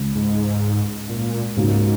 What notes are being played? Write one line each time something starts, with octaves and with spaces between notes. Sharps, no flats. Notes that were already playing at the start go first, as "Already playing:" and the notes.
Already playing: C#2 C#3 G#3
G#2
A#2
C#2 G#2 C#3 A#3 D#4 F#4